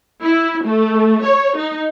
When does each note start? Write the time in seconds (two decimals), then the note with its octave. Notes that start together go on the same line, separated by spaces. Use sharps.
0.23 E4
0.65 A3
1.24 C#5
1.57 D#4